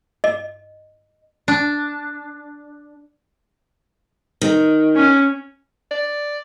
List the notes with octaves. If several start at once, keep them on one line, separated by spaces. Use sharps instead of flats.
D#5
D4
D#3
C#4
D5